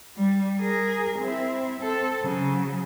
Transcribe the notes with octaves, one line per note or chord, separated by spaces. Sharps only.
G3
G#4 A#4
C4 E4
C4 A4
C#3 F#3